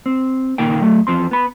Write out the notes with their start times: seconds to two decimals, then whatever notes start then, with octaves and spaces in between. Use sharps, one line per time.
0.06 C4
0.58 C#2 A#2 D#3 A#3 G5
0.81 F#3 A3
1.07 E2 F3 C4 C6
1.31 B3 B5